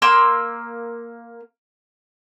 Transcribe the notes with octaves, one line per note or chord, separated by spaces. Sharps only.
A#3 C6 E6